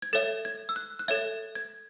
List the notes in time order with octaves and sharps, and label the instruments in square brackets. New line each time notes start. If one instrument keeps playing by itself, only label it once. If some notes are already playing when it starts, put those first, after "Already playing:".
[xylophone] G#6
A4 C#5 E5 A6
G#6
E6
F#6
F#6
A4 C#5 E5 G#6
G#6